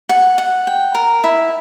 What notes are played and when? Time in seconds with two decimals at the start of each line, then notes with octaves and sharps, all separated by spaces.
0.09 F#5
0.38 F#5
0.67 G5
0.95 A#4
1.24 E4